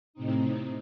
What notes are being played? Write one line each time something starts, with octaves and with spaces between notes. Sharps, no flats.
A2 C3 C4 D#4